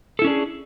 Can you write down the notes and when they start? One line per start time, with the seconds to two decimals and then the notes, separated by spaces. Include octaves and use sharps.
0.19 A4
0.22 E4
0.24 C#4
0.27 D4
0.30 G#4